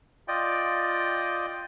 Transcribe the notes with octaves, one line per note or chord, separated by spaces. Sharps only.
F4 D5 D#5 G5